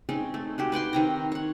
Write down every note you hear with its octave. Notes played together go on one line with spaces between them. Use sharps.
G#3 C4 C#4 D#4
A3
G#3 F#4 G4
B4 F#5 G5 C6
D#3 C4 A#5
C#5 F#5